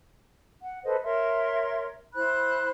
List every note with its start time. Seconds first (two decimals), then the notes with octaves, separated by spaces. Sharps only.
0.61 F#5
0.84 A4 B4 C5 D#5
1.03 A#4 C#5 E5 C6
2.13 E4 C5 B5 F#6